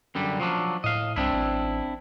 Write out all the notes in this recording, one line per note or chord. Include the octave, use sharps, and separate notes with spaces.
F#2 D3 G3
F3 F#3 D4
A2 D#5 F5
C2 C4 D4 E4
A1